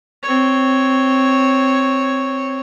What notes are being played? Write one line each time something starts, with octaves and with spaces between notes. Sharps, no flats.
C4 C#5